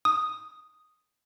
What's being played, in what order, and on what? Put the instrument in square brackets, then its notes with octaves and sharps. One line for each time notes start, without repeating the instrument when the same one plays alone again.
[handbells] D#6